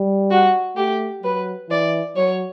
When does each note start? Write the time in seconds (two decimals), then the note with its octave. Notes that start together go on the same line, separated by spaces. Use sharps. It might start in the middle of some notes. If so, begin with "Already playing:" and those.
Already playing: G3
0.30 F#4
0.76 A3 G4
1.23 F#3 B4
1.69 E3 D5
2.16 F#3 C#5